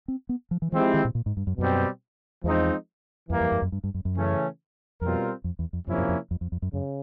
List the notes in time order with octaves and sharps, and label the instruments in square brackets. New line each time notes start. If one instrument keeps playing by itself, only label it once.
[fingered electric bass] C4
B3
F3
E3
[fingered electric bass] E3 [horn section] F3 G#3 C4 E4 G4
[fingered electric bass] D#3
A#2
A#2
G#2
G2
F#2
[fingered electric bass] F#2 [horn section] B2 G3 C4
[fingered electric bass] E2 [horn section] F3 G#3 C4 D#4
[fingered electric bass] F2 [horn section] E3 G3 A#3
[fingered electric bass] F2
F#2
F#2
G2
G2
F#2
F#2
[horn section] C#3 E3 A3 C#4
[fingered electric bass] F2 [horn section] B2 G3 C4 F4 A#4
[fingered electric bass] F2
E2
F2
[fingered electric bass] F#2 [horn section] C3 F3 A#3 C#4 E4
[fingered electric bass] F#2
F2
F2
F2
F2
F#2
[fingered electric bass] F#2 [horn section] C#3